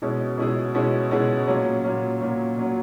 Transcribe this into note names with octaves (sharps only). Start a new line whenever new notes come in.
B2 G#3 C#4 E4 G#4
B2 G#3 C#4 E4 G#4
B2 G#3 C#4 E4 G#4
B2 G#3 C#4 E4 G#4
A#2 F#3 C#4
A#2 F#3 C#4
A#2 F#3 C#4
A#2 F#3 C#4